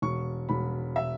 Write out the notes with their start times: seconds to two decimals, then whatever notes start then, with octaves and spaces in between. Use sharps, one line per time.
0.02 E1 C#6
0.49 E1 B5
0.96 E5